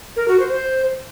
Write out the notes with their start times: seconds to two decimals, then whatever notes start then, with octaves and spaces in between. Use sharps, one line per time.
0.16 A#4
0.28 F#4
0.40 C5
0.52 C5